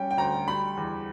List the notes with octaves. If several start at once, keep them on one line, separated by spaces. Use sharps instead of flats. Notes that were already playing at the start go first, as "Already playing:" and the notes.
Already playing: G3 C#4 G5
G5
D2 A#5
G3 B5
E2